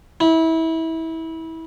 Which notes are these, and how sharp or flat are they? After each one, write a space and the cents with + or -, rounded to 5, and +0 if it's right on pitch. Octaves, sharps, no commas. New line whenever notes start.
E4 -25